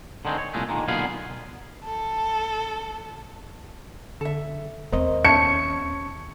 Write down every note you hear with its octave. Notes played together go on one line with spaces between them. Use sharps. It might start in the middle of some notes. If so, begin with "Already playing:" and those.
D3 D#3 G#3 C4
C#5
C2 A#2 G#3 A3
A#2 D3 D#3 G#3 A#3
B1 A#2 D3 B3 G#4 F5
A4
D3 A4 E5
D#2 C4 A#4 C5 D#5
C#4 A5 C#6 G#6 C#7